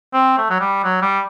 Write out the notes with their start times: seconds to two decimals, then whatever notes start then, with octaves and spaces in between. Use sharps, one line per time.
0.14 C4
0.38 A3
0.50 F#3
0.61 G3
0.84 F#3
1.02 G3